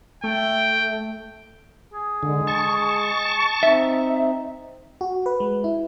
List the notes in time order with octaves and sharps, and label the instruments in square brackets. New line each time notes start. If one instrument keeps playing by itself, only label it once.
[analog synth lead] A3 [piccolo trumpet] G5
[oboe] G#4
[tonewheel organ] D3 [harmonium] G#3
[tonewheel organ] A5 C#6
[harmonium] C4 D#4 [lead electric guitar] E5
[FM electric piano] F#4
B4
G#3
E4